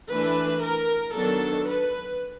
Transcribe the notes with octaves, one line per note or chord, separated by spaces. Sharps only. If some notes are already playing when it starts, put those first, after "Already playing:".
E3 A3 D4 B4
A#4
D#3 F#3 B3 D4 A4
B4